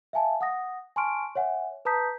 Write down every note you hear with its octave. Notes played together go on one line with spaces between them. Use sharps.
E5 F5 G#5 A5
F#5 D#6 A#6
G#5 A5 C6 C#6 F6 D7
C#5 E5 F#5 G#5
B4 A5 A#5 D#6 G6 B6